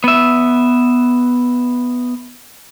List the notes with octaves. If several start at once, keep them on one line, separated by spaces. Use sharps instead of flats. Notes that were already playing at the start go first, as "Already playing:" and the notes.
B3 E5